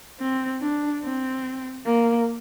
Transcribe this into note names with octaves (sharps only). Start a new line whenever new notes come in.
C4
D4
C4
A#3